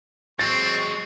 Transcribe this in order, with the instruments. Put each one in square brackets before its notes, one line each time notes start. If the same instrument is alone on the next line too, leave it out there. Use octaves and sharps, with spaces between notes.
[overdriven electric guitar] F#3 G#3 [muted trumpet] C4 [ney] C#6 [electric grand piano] A6